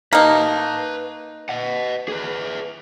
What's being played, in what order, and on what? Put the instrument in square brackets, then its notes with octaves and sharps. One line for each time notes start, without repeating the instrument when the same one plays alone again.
[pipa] A#3 D#4 [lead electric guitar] B4 A5
[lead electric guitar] D#5 F#5
G#4 B4